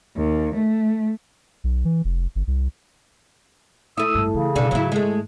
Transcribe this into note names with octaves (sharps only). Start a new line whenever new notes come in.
D#2
A3
B1
E3
F1
G1
C2
A3 E4 D#6 E6
G#1 G2
C#3 E3
G2 B2 D3 C#4 G#4
G#2 D#3 F#3 E4
G#3 A3